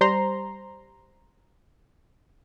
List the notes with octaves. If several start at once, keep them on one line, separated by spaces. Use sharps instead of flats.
G3 C5 A#5 C6